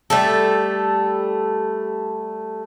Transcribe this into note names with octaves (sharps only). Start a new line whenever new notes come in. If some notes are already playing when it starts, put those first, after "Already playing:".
G3 A3 A4